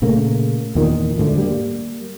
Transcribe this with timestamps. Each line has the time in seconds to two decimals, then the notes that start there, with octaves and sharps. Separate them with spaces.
0.02 A#2 C#3 A3 A#3
0.75 E2 A#2 D#3
1.18 D2 G#2 D3 A3
1.38 G3 A#3